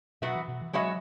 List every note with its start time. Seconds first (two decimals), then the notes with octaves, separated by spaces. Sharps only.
0.22 B2 F#3 B3 F#4 E5
0.35 E3
0.48 B2
0.61 E3
0.73 F#3 G#3 B3 F#4 C#5 E5